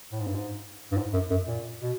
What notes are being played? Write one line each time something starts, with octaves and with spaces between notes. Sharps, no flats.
A2
G#2
G2
G#2
G2
G#2
F#2
F#2
A#2
B2